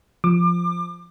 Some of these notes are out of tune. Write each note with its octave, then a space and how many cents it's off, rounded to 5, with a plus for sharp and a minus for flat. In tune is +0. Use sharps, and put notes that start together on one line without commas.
F3 +0 D6 +30